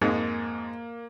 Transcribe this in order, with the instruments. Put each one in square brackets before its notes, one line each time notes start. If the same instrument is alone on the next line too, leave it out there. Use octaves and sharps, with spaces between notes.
[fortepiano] F2 G#2 G#3 [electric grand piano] A#3